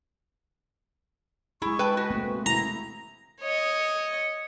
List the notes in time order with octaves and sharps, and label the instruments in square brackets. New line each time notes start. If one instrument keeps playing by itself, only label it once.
[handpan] G#3 G#4 [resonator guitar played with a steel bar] E4 [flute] C#6
[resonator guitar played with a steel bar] B4 G5 A5
[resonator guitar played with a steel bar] F#4 [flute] B4
[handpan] A3 A#3 C4
[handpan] E4 [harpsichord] A#5 [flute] A#6
[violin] C#5 D#5